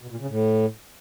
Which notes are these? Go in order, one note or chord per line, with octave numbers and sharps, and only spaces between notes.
B2
A#2
C#3
A2